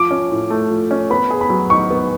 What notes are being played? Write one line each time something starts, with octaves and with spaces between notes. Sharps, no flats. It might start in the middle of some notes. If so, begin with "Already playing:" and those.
Already playing: F3 D6
C#4
A2
A3
F3
C#4
B3 B5
G#4
B5
F#3
D#4 C#6
B3